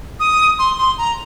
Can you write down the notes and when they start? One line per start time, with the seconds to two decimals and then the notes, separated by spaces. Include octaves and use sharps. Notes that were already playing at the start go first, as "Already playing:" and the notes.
0.20 D#6
0.59 C6
0.78 C6
0.98 A#5